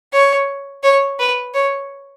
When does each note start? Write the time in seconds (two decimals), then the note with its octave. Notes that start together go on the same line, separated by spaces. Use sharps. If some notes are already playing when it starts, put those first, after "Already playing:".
0.13 C#5
0.83 C#5
1.19 B4
1.54 C#5